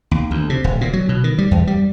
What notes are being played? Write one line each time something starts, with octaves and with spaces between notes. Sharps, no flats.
D#2
D2
C3
D#1
A#2
F#3
B2
D#3
G3
E2
G3